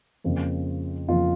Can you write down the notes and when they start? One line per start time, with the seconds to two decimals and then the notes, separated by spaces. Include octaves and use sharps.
0.24 F2 C#3 F3 A#3
1.09 F2 C#3 F3 A#3 F4